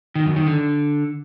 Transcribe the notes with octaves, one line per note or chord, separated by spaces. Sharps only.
D#3
F#2
D#3
D3